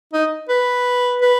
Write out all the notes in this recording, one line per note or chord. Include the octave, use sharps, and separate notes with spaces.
D#4
B4
B4